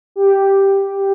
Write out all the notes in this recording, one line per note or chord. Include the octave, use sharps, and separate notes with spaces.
G4